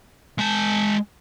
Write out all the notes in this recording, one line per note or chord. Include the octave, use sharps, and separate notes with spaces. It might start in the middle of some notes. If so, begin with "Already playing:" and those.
G#3 A5